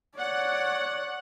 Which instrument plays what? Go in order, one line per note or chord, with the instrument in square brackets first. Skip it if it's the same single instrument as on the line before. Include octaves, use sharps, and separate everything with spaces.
[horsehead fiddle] C#5 D5 [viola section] F#5